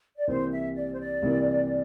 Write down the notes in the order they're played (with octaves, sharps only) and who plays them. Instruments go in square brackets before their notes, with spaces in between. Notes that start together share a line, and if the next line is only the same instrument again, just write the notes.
[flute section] D5
[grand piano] C2 C3 E3 A#3 [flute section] C5
[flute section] E5
D5
C5
D5
[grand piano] C2 C3 E3 A#3